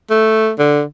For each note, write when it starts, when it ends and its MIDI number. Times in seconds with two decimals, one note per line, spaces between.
0.10 0.51 57
0.59 0.82 50